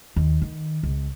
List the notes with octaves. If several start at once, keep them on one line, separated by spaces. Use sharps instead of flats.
D#2
D#3
C#2